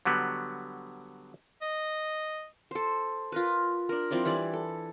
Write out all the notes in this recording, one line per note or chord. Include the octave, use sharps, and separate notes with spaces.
D3 F#3 G3 B3
D#5
A4 C5
F4 A#4 B4
D4 A#4
F3 C4 E4 D5
E3 G3 D5 B5
A4